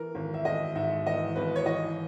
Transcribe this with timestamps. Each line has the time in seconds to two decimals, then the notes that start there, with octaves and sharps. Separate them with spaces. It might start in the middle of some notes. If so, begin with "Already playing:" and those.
Already playing: E3 A#4
0.15 G#1
0.34 E5
0.45 G#1 D#5
0.76 G#2 E5
1.06 E3 D#5
1.36 G#1 B4
1.56 C#5
1.66 E3 D#5